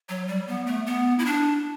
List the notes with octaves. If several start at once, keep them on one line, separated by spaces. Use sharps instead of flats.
F#3
G3
B3
A3
B3
E4
D4